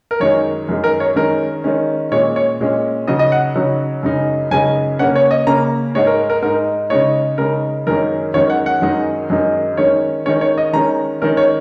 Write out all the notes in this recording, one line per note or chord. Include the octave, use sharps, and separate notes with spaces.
A#4
F#2 D#3 G#3 C#5
F#2 D#3 G#3
A#4
C#5
D#3 G#3 C#4 A#4
D#3 G#3 C#4
A#2 G#3 C#4 C#5
C#5
A#2 G#3 C#4
C#3 F#3 D#4 D#5
D#5
F#5
C#3 F#3 D#4
F#2 C#3 G#3 D#4
F#2 C#3 G#3 D#4 G#5
C#3 A#3 C#4 F#5
C#5
D#5
C#3 A#3 C#4 A#5
G#2 G#3 D#4 C#5
A#4
A#4
G#2 G#3 D#4 A#4
C#3 G#3 D#4 C#5
C#3 G#3 D#4 A#4
F#2 D#3 G#3 C#4 A#4
F#2 D#3 G#3 C#4 C#5
F#5
F#5
F#2 D#3 G#3 D#4
F#2 D#3 G#3 D#4
D#3 G#3 C#4 C#5
D#3 G#3 C#4 C#5
C#5
D#5
D#3 G#3 C#4 A#5
D#3 G#3 C#4 A#4
C#5